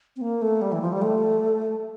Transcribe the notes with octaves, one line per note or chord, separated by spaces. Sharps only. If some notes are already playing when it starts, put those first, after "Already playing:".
C4
A#3
A3
G3
E3
F3
G3
A3